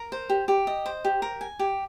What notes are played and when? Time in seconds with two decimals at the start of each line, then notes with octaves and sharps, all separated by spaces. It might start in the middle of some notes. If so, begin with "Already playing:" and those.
Already playing: A#4
0.12 C5
0.29 G4
0.48 G4
0.67 D#5
0.86 C5
1.05 G4
1.22 A#4
1.41 G#5
1.59 G4